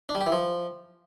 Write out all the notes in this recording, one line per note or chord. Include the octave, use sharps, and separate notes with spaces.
D4
G3
G4
E3
F3